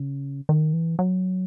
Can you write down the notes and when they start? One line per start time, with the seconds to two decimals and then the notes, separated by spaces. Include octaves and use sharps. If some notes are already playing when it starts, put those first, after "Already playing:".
Already playing: C#3
0.49 D#3
0.73 E3
0.99 F#3